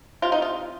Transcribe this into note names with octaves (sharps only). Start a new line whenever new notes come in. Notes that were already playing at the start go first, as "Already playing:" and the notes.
C3 F4
D#4
F4